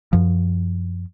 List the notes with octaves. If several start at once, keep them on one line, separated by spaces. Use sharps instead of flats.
F#2 F3